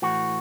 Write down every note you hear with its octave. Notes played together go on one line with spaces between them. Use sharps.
A2 E3 F#4